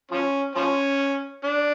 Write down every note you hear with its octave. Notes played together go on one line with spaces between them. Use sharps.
F3 C#4
F3 C#4
D4